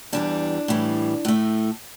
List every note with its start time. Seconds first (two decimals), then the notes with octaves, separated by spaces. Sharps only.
0.13 E2 E3 G3 D4
0.68 A2 E3 G3
1.25 A2 A3